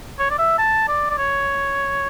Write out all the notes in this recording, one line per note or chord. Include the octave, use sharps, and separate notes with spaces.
C#5
D5
E5
A5
D5
D5
C#5